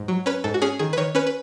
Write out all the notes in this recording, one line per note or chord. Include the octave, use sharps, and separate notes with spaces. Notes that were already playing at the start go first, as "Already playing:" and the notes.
Already playing: G#2
F#3
C#4 B4
G#2 A4
F#4
C#4 G#4
D#3 G#4
B4
D#3 C#5
C#4 B4
B4